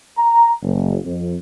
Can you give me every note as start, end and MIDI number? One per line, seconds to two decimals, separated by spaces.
0.18 0.50 82
0.63 0.97 30
1.05 1.34 41